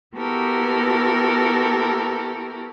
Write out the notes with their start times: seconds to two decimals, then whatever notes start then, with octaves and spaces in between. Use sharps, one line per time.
0.15 B3 E4 F#4 G4 A4 A#4